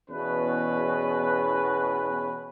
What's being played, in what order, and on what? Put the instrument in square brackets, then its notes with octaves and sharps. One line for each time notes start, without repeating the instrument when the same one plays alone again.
[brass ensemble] E2 B2 C#4 B4